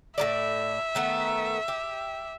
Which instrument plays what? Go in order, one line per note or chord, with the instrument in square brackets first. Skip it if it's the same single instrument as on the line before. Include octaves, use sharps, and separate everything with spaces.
[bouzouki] A2 F#3 D5 [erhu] E5
[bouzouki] D#3 A3 B3
G4